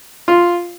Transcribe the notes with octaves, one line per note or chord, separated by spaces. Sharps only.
F4